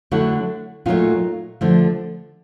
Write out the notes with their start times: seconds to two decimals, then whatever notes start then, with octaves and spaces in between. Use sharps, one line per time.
0.11 D3 F#3 A3 E4 F#4
0.86 A#2 F#3 A3 D#4 F4
1.61 D3 F3 A3